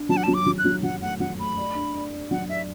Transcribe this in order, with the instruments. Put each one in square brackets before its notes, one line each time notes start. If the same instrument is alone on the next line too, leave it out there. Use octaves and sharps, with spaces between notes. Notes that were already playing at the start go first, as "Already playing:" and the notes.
Already playing: [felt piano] D4
[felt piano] F#3 [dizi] A5
[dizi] F#5
A5
[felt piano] F#3
[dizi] D6
[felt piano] F#3
[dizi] F#6
[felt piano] F#3
[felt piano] F#3 [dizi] F#5
[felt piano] A3 [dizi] F#5
[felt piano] F#3 [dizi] F#5
[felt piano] A3 [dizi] B5
[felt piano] D5
D4
D5
D5
[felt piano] F#3 [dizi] F#5
[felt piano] D5 [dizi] E5